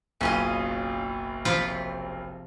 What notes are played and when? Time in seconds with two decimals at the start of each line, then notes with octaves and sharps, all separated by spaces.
0.21 F#1 B1 C#4 F4 D#5
1.45 C3 F3 F4 B5